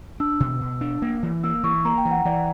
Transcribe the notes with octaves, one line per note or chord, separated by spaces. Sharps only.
D4 E6
B2
B2
D4
A#3
E3
A#3 E6
E3 C#6
A#3 A#5
G5
E3
F#5
E3 D5